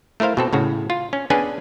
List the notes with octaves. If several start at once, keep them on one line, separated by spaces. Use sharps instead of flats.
A3 E4 A#4 C5 F5
B2 C4 A4
A2 C#3 F#4
F4
C#4
B3 C#4 D4 G#4 B4 G#5